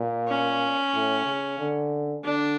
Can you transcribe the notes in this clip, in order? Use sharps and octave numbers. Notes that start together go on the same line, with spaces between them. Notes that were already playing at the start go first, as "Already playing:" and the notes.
Already playing: A#2
C#4
A2
C#3
D3
D3 D4